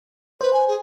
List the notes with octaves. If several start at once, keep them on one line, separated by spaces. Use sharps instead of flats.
B4 C5
G#5
G#4